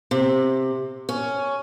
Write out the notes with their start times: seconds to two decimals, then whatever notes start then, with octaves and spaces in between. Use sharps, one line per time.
0.11 C3
1.09 C#4